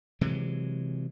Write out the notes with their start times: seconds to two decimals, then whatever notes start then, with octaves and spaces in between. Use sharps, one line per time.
0.21 C3 E3 F#3 G#3